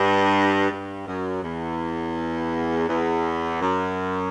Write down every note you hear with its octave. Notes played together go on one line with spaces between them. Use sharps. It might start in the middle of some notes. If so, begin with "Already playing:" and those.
Already playing: G2
G2
F#2
E2
E2
F#2